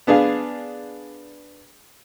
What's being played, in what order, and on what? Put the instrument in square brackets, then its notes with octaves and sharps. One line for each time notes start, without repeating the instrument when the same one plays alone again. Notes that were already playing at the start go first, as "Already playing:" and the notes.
[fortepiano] B3 D4 G#4 F5